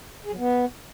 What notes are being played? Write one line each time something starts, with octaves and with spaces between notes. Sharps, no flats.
G#4
F#3
B3